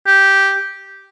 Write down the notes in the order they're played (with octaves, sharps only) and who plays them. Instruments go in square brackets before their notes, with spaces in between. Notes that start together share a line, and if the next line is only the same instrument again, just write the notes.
[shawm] G4